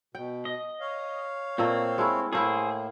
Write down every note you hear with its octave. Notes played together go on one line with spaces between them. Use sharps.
B2 G5
D#5
C#5 F5
A#2 A3 A#3 C4
G#3 A3 E4
A2 A3 A#3 E4 G#4 C5